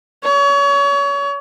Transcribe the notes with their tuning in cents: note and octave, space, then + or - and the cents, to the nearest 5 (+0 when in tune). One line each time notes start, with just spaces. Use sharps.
C#5 +30